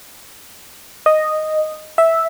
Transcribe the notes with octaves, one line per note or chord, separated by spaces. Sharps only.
D#5
E5